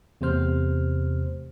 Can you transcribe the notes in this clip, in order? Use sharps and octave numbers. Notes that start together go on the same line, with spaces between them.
E2 C3 A3 C5 F6